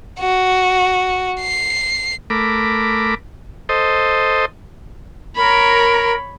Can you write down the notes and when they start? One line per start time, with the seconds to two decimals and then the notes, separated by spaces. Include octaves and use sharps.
0.20 F#4
1.41 C7
2.30 A3 A#4 B5 D6
3.69 A4 C5 D#5
5.36 A#4 C#5 B5